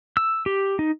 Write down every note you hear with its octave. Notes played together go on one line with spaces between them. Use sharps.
E6
G4
D#4